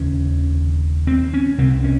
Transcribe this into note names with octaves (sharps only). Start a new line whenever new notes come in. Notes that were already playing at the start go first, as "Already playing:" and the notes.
Already playing: F1 D#2 C#3 C#4
C4
C#4
C2 C3 C4
C#4